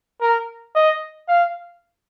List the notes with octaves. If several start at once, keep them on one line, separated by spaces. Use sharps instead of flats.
A#4
D#5
F5